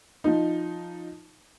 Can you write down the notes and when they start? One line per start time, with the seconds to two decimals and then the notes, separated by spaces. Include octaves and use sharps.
0.24 F3 D#4